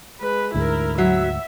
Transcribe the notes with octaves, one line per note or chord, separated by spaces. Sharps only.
G#3 B4
D2 G#2 D3 E4 A#4
F#3 E5